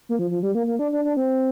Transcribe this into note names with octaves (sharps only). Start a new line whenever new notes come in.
A#3
F3
F3
G3
A#3
A#3
D4
D4
D4
C4